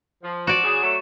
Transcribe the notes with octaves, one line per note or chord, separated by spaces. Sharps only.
F3
F#4 D5 E7
C#3 F#3 G#4
F#3 A3